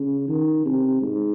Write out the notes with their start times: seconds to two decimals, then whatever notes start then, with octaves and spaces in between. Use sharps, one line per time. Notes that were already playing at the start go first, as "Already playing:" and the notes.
Already playing: C#3
0.29 D#3
0.65 C3
1.01 G#2